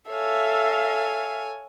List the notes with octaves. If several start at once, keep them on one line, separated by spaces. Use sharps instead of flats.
A4 C#5 E5 F5 G#5